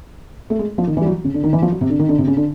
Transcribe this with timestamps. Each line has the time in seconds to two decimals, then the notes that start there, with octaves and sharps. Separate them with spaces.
0.50 A3
0.59 G#3
0.78 F3
0.87 D#3
0.97 E3
1.01 G3
1.06 F#3
1.24 C#3
1.34 D3
1.43 D#3
1.53 E3
1.62 F3
1.72 F#3
1.81 C3
1.90 D3
1.99 D#3
2.09 D3
2.18 C3
2.27 C#3
2.37 D3